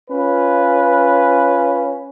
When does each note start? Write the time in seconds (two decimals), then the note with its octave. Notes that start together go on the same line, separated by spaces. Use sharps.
0.10 C#4 F4 B4